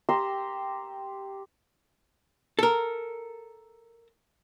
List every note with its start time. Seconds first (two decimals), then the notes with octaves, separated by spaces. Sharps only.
0.09 G4 A#5 C6 E6
2.59 A4 A#4